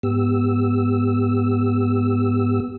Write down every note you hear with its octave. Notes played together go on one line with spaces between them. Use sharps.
G#2 B3 G4 E6